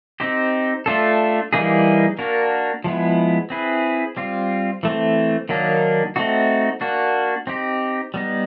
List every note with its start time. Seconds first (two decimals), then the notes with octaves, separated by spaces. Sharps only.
0.20 C4 D#4 G4 C5
0.86 A3 D4 F4 A4
1.53 E3 G3 A#3 D#4 G#4
2.19 A#3 D4 F#4 A#4
2.84 F3 G#3 B3 E4
3.50 C4 E4 G#4 B4
4.17 G3 C4 F4
4.83 E3 A3 C4
5.49 D#3 F#3 A#3 D4
6.16 A3 C4 D#4 F#4
6.81 A#3 D4 F#4
7.47 C4 D#4 G4
8.14 G3 B3 D#4